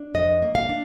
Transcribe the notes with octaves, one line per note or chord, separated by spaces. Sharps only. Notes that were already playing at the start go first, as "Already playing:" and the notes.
Already playing: D4
F2 D#5
A#3
F5
D4